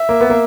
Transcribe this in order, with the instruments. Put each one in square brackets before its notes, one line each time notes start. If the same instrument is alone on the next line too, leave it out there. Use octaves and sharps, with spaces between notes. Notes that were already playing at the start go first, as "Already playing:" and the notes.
Already playing: [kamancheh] E5
[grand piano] A#3
B3
A#3